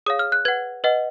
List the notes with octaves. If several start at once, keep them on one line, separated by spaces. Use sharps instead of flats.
G#4 C#5 F5 D#6
F6
F#6
B4 F#5 G#6
B4 D#5 F#5